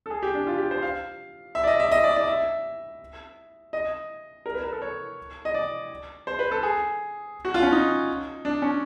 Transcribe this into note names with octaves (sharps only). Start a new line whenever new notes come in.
A4
G#4
G4
D4
F4
G4
C5
F5
E5
D5
D#5
E5
D#5
D5
D5
E5
D#5
A#4
B4
A#4
A4
C#5
D#5
D5
C5
B4
A4
G#4
F#4
F4
C#4
D#4
D4
C#4